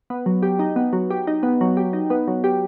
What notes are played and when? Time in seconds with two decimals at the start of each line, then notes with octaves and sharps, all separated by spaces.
0.10 B3
0.26 F#3
0.43 G4
0.59 D#4
0.76 B3
0.93 F#3
1.10 G4
1.27 D#4
1.43 B3
1.61 F#3
1.77 G4
1.93 D#4
2.10 B3
2.28 F#3
2.44 G4